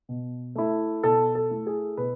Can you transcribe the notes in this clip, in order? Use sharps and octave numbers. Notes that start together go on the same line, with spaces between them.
B2
A3 E4
B2 A4
A4
A3 E4
G#4
B2 B4